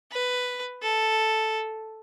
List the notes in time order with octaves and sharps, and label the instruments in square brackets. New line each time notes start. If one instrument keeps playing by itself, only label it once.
[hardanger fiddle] B4
A4